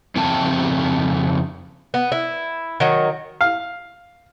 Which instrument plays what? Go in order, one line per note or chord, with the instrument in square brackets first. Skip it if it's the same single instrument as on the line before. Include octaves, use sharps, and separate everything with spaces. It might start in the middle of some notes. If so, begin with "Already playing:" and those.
[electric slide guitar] F2 C#3 A3 C4 G5 A5
[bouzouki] B3
E4
D#3 F#3
[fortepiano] F5